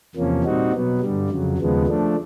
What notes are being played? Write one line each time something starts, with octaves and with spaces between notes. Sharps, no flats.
E2 C3 F3 A#3 C#4
A#2 G3 C4 D#4 F#4
B2 F#3 B3
G2 D3 G3
F2 C#3 F#3
D#2 C#3 F3 G#3 B3
F3 A3 D4